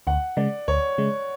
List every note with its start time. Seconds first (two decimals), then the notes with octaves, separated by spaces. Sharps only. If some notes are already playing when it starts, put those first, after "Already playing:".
0.07 D2 F#5
0.37 C#3 G#3 D5
0.68 D2 C#5
0.98 C#3 G#3